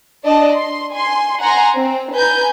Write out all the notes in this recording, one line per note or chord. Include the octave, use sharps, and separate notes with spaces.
D4 D5 D#5 A5
C6
G#5 C6
F#5 G#5 A#5 C6
C4
B4 G#5 A#5 G6